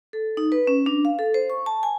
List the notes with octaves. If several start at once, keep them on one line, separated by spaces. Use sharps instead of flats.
A4
D#4
B4
C#4
D4
F5
A4
C5
C#6
A5
G#5